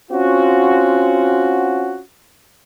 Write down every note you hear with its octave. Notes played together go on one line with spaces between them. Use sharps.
C4 C#4 F4 F#4